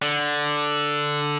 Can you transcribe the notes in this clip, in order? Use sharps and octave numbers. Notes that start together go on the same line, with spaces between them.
D3